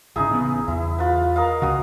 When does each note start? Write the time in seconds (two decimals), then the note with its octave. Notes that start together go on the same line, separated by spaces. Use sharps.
0.16 G#1 C#3 D#4 E4 G#4
0.29 A1 C#3 B3
0.68 E2 E4
0.99 F4 B4
1.36 A#4 D#5 F5
1.62 C#2 C#3 F#4 D#6